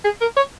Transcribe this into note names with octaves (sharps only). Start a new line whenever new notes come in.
G#4
A#4
C#5